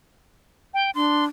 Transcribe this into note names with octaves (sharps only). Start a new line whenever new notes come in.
G5
D4 C6